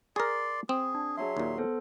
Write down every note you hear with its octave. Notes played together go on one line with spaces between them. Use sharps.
G#4 A#4 D5 C6
C4 G#4
D4
F#3 G#4 C#5 E5 C6
D#2 A#2
B3 A4 C5